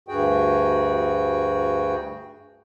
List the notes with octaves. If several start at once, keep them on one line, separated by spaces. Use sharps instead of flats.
D2 G2 F#4 G#4 G5